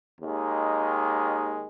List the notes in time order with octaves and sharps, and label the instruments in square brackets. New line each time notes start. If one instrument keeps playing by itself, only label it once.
[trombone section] D#2 D#3 G#3